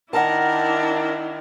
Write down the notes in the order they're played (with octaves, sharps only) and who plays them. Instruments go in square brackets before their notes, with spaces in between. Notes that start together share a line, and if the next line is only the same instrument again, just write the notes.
[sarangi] D#3 [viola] D4 E4 [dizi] A#4 [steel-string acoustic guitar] F#5 A5